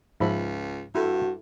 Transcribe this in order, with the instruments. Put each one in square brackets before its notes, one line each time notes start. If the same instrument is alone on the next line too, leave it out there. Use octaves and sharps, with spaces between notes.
[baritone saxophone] C#2 [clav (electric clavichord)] G#2 F3 [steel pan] E5 B5
[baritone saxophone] G2 [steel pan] E4 A4 [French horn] F#4